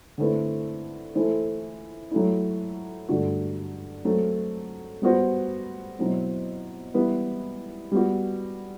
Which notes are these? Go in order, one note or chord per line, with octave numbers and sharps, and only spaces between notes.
D3 A3 C4 E4 B4
E3 A3 E4 A4 C5
F#3 A3 E4
G2 D3 A3 D4 F#4
F#3 A3 C4
G3 B3 F#4 C5
B2 F#3 C4 E4
E3 G3 B3 E4 B4
G3 B3 F#4